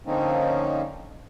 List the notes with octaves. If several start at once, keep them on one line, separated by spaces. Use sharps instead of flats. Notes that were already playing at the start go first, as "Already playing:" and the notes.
D3 F3 A#3 C4 C#4 D#4